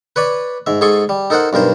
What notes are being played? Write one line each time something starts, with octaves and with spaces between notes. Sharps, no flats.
B4 C#5 D5 B5
G#2 E5
G#2 G#4 A4 C6 C#6
G3
D#4 A4 A#4 C5 F#5
B1 G2 A#4 C5